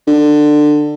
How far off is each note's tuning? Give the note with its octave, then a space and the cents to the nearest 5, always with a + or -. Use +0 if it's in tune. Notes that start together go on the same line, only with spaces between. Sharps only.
D3 +20